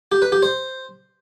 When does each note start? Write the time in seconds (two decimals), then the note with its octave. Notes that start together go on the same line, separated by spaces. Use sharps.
0.12 G4
0.22 B4
0.32 G4
0.43 C5